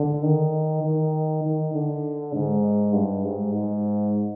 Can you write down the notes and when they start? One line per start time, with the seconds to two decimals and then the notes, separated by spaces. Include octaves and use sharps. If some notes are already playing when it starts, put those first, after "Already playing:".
Already playing: D3
0.23 D#3
0.83 D#3
1.43 D#3
1.74 D3
2.34 G#2
2.93 G2
3.25 G#2
3.54 G#2